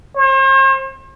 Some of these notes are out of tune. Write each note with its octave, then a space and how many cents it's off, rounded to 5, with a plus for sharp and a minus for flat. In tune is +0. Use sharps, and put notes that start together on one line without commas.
C5 +45